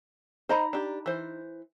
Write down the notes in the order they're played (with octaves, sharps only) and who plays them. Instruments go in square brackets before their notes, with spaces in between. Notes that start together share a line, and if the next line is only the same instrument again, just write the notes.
[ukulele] D#4 A#5 B5 [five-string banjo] C5 D#5
[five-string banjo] D4 G4
E3 C5